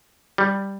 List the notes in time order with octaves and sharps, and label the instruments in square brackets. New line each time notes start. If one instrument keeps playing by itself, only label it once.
[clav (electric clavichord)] G3